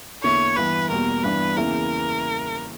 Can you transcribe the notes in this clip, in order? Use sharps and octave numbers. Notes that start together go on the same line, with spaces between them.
E2 D3 A#3 E4 C#5
G2 E3 B3 B4
E2 B2 G3 A#3 A#4
G2 E3 B3 D4 B4
E2 C#3 E3 A#3 E4 A#4